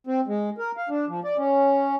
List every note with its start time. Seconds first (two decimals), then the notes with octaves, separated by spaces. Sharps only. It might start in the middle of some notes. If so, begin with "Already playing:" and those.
0.07 C4
0.27 G#3
0.58 A#4
0.77 F5
0.89 D4
1.08 F3
1.24 D5
1.37 C#4